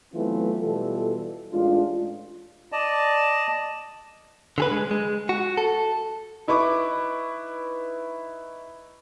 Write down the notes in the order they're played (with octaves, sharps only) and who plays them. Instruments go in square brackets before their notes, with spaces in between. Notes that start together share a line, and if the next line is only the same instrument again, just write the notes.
[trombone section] E3 F#3 A3 B3 C4 F4
B2 E3 G3 F4 A4
A1 G#3 D4 F4
[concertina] D5 D#5 A5
[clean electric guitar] D3 G#4 B4
G#3
G#3
F#4
A4
[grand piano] D#4 E4 B4 C#6 D6